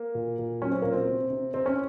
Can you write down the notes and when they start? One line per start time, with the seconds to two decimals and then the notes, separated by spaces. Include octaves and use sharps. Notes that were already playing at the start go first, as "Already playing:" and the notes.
Already playing: A#3
0.15 A#2
0.39 A#2
0.61 F#3 C#4
0.71 C4
0.82 A#2 A#3
0.92 C4
1.08 C3
1.30 C3
1.54 C3 C4
1.66 C#4